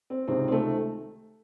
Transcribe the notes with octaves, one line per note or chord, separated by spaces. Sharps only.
C4
C#2 C3 D#3 C4
C4
A3